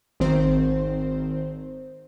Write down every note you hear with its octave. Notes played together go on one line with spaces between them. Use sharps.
G#1 D#3 C4 C5